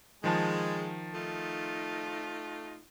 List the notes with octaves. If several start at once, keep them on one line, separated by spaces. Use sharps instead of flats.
D#3 F3 G#3 A5
A3 D#4 F4